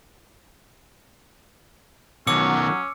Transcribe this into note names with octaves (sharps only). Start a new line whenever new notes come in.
B2 D#3 F#3 C#4 D6 E6 C#7